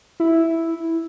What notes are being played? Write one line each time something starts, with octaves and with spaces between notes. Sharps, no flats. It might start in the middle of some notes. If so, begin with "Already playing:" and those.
E4